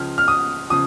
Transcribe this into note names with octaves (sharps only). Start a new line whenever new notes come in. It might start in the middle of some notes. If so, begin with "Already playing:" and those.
Already playing: C#2 C#3 F3 F6
F6
D#6
C#3 F3 D#6